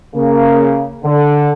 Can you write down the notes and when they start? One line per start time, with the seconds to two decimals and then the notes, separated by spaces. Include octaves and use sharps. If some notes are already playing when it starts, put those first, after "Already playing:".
0.15 C#3 A#3
1.04 D3